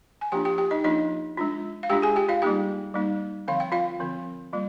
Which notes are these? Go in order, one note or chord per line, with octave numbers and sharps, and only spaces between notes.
G#5
F3 A#3 D4 F4 G4 G5
G4 G5
G4 G5
D#4 D#5
F3 A#3 D4 D#4 F4 D#5
G#3 D4 F4
F5
G#3 D4 F4 G4 G5
G#4 G#5
G4 G5
F4 F5
G3 A#3 D#4 G4 G5
G3 A#3 D#4
D3 F3 C4 F5
G5
F4 F5
D3 F3 C4
G3 A#3 F4